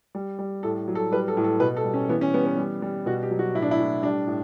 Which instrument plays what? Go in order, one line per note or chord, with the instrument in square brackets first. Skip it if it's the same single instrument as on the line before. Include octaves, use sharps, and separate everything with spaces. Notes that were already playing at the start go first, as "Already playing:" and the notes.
[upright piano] G3
G3
A2 A4
F#3
A4
G3 B4
A4
A2
A4
B2 B4
A4
G3
C#4
E3 B3
C#4
G3 B3
B3
G3
G3
B2 F#4
G4
F#3
F#4
A2 E4
D4
E4
A2
G3 D4
A2